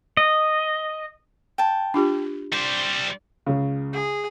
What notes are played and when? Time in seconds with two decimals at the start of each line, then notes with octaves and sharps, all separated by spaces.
0.17 D#5
1.58 G5 A5
1.94 D4 F4 G4
2.53 G3 C5 D5
3.46 C#2 C#3
3.93 G#4